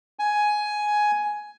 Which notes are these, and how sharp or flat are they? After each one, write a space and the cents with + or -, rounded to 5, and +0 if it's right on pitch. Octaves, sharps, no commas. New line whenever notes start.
G#5 +10